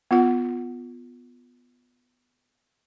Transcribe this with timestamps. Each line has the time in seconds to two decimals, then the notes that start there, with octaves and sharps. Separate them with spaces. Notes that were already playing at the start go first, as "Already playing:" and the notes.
0.11 B3 F4 F#5